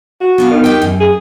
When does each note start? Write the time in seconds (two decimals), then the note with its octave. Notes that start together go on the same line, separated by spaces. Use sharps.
0.21 F#4
0.38 B3 D4 F5
0.51 D#3
0.64 G4 B4 G5
0.82 F#2
1.00 G#4